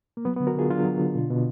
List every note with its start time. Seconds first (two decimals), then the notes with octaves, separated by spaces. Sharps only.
0.17 A#3
0.25 F#3 B3
0.37 B3
0.40 D3
0.47 F#4 A#4
0.55 D3 F4 G#4
0.70 F#3 D4 F4
0.85 F#3
1.00 D3
1.15 B2
1.30 B2